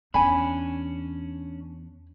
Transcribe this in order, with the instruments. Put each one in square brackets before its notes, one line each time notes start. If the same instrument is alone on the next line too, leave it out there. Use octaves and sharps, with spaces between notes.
[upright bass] E2 [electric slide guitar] C#4 D4 [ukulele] G#5 B5